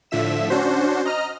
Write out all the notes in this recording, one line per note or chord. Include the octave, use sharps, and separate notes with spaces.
A2 D3 F3 E5 B6 E7
C#4 D4 F#4 C5
D#5 A#5 F6